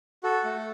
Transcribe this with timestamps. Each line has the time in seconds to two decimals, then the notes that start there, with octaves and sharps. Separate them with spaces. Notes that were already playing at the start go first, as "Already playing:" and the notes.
0.23 F#4 A4
0.44 A3